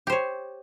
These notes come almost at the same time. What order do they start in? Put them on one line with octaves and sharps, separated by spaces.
G4 C5 C#5